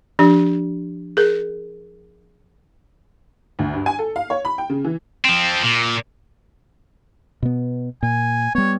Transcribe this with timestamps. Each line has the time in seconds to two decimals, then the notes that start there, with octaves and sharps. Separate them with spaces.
0.19 F3 D4 G4
1.17 G#4 A#4
3.59 D2
3.74 G2
3.86 G#5
3.99 A4
4.16 F5
4.30 C#5
4.45 B5
4.58 G5
4.70 C#3
4.84 E3
5.25 F3 C4
5.63 A#2
7.43 B2 B3
8.03 A#2 G#5
8.55 G3 B3 C#5